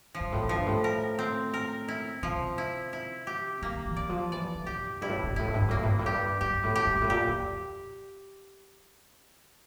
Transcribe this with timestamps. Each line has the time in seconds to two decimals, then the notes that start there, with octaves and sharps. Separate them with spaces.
0.15 F3
0.20 G2
0.32 A2
0.44 F2
0.49 G2 F3
0.67 A2
0.84 A#4
1.19 C4
1.54 A#4
1.88 E4
2.23 C3 F3
2.58 E4
2.93 E4
3.27 G4
3.62 D3 A#3
3.86 E3
3.97 D5
4.09 F3
4.32 E3 D5
4.55 D3
4.66 G4
4.79 F2
5.01 G2 E4
5.09 A2
5.16 G2
5.23 A2
5.31 G2
5.36 A2 E4
5.47 G2
5.54 A2
5.61 G2
5.68 A2 A#3
5.76 G2
5.83 A2
5.91 G2
5.99 A2
6.06 G2 G4
6.41 G2 G4
6.63 A2
6.76 G4
6.87 A2
6.95 G2
7.02 A2
7.10 A#2 G4
7.28 F2